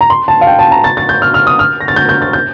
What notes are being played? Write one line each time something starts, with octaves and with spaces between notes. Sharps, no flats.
A#5
C6
A5
F5
G5
A5
A#5
A6
A6
G6
F6
F6
D#6
F6
A#6
A6
G6
G6
A6
G6